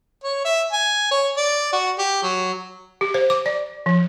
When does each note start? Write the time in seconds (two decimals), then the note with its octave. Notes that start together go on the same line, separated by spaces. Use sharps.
0.24 C#5
0.45 E5
0.73 G#5
1.11 C#5
1.37 D5
1.72 F#4
1.98 G4
2.23 F#3
3.01 G4
3.14 C5
3.30 D6
3.46 D5
3.86 F3